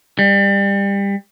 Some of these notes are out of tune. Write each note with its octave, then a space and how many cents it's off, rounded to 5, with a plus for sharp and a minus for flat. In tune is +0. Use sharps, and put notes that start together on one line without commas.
G3 +25